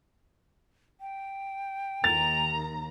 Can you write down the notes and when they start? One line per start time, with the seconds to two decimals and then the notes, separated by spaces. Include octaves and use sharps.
1.01 G5
2.04 D#2 A#5 A6 F7